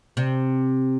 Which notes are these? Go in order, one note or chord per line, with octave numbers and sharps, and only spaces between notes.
C3